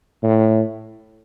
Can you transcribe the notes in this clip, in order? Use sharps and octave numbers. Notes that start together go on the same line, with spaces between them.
A2